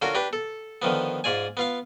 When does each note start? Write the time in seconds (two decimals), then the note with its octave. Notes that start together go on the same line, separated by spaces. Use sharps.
0.02 D3 C#4 F4 F#4 A#4
0.15 D4 G4 B4
0.33 A4
0.82 D3 D#3 F3 B3
1.24 G#2 F4 D5 G#5
1.57 B3 F4 F5